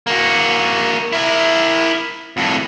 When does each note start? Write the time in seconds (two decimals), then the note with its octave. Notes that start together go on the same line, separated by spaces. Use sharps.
0.07 A#3 F#4
1.13 E4 A#4
2.37 F2 A2